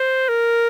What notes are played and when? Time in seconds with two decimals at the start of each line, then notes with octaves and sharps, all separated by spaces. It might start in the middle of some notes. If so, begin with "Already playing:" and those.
Already playing: C5
0.28 A#4